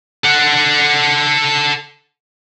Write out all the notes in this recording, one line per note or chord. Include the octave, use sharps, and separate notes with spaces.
A4 F#5